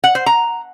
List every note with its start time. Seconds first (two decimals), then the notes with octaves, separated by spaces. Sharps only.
0.04 F#5
0.15 C5
0.26 A#5